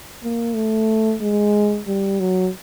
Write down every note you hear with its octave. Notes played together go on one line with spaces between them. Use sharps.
A#3
A3
G#3
G3
F#3